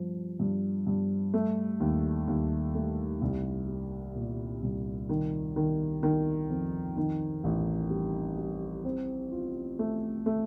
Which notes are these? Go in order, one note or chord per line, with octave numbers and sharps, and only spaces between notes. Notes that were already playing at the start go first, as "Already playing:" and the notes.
Already playing: G2 F3
G2
G2
A3
D#2
D#2
A3
C2
G3
A#2
C2
D#3
D#3
D#3
F2
D#3
A1
G3
G3
C4
F4
A3
A3